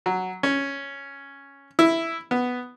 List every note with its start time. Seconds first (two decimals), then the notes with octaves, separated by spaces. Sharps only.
0.06 F#3
0.43 C#4
1.79 E4
2.31 B3